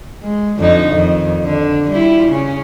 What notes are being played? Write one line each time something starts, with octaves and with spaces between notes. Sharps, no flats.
G#3
F2 D3 D#4
F2 D#3
D3
G3 E4 F4
C#3 C#4